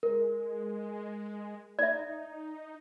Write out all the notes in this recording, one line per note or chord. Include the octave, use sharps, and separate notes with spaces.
G#3 A#4
D#4 D5 E5